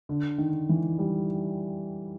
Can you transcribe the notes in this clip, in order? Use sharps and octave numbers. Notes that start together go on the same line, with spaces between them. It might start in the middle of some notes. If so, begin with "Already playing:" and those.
D3
D#3
E3
G3